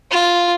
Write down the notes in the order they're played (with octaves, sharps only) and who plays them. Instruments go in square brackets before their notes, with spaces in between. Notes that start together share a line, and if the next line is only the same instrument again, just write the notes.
[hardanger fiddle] F4